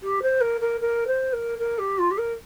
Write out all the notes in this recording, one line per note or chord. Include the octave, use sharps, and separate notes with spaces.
G4
C5
A#4
A#4
A#4
C5
A#4
A#4
G4
F4
G4
A#4